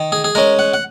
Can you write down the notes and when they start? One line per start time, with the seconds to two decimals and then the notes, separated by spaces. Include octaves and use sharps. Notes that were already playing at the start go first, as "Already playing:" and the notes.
Already playing: D#3
0.12 G#4
0.24 G#4
0.35 G#3 C#4 A#4
0.59 F#5
0.74 F#5